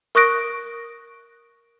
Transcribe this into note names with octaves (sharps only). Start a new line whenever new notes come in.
A#4 C#6 D#6 F#6 A#6 D7